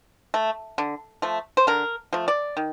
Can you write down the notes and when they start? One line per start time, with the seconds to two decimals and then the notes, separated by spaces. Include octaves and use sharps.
0.34 A3
0.78 D3
1.22 F3 A3
1.57 C5
1.67 D3 A#4
2.13 F3 A3
2.28 D5
2.57 D#3